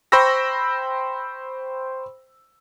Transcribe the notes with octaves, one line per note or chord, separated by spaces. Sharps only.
C5 G5 B5 C#6 E6 A#6